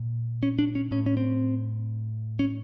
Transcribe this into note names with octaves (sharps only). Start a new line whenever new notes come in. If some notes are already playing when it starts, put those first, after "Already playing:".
Already playing: A#2
C#4
D4
C#4
A2 C#4
C#4
C4
C#4